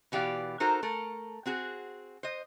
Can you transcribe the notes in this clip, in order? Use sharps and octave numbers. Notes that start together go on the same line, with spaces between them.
B2 E3 G4 D5 F5
D#4 F#4 A4 A#4 C5
A3 A4 A#4
C4 F#4 G#4
C5 D#5